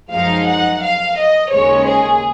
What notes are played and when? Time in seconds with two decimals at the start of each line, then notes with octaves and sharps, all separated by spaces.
0.10 F#2 F3 G#3 D#4 F5
0.45 F#5
0.82 F5
1.17 D#5
1.51 D#2 C#3 G#3 C#4 C#5
1.87 G#4